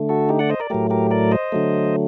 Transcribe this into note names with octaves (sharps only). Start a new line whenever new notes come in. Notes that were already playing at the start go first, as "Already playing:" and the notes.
Already playing: D3 A3
F#4 A4
D#4 G4
D5 F#5
C5 D#5
A#4 D5
A2 F#3 A3 G4 A#4
G4 A#4
A#4 D5
C5 D#5
D3 F#3 A3